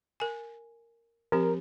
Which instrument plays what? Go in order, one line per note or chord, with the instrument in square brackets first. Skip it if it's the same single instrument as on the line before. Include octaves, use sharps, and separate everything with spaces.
[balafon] A#4 G#5
[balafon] F3 C4 G4 [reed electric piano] A#4